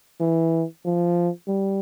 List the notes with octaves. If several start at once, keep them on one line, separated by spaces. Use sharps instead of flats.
E3
F3
G3